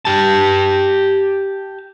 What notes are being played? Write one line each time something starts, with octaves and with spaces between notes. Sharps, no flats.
G4 A5